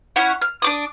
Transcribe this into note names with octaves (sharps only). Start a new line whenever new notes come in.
C#4 E4 C#5 F#5
F6
D4 D6 D#6